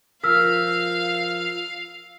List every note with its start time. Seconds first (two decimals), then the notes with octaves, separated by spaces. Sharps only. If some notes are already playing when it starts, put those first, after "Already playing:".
0.23 F3 A#4 F5 E6 F6 B6